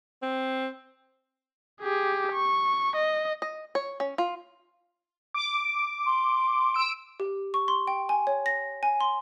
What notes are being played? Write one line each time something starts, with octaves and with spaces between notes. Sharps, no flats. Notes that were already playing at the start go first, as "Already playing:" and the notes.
C4
G4 G#4
C#6
D#5
D#5
C#5
C#4
F4
D6
C6
E6 D7
G4
C#6
C6
G5
G#5
C#5
A#6
G#5
C6